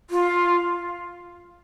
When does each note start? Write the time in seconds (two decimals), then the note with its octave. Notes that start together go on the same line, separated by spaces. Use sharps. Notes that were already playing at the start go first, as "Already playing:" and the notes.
0.10 F4